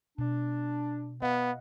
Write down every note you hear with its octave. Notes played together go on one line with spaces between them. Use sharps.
B2 D4
B3 D#5 F5 F#5